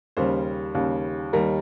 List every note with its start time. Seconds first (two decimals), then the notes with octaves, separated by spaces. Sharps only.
0.17 D#2 C#3 G3 C5
0.75 D#2 C#3 G3
1.33 D#2 D#3 G3 A#4